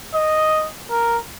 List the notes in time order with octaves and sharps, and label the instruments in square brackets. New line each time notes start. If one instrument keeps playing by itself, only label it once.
[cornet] D#5
A#4